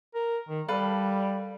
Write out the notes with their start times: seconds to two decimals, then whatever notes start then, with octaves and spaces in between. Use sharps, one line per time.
0.15 A#4
0.49 D#3
0.68 G3 A4 B4 F5